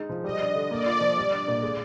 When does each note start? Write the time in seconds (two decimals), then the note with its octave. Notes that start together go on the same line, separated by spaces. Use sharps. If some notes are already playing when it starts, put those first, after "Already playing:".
Already playing: G#3 D#4
0.09 F3
0.24 G3 D#5
0.41 D4
0.55 D3
0.71 A#3 D5
0.86 F4
1.01 F3
1.17 G3
1.33 D4
1.48 A#2
1.62 G#3